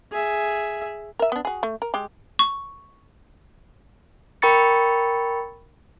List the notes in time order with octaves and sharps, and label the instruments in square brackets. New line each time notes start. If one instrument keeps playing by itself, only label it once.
[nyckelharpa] G#4 E5
[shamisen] A#4 E5
B3 D4
F#4 G#4
A3
A#4
G#3 G4
[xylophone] C#6
[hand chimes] A#4 G5 B5 C#6 A6 C#7